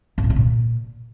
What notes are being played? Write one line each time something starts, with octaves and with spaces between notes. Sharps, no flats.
F#2
A2
B3
A#2